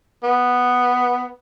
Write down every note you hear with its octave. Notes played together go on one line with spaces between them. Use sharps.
B3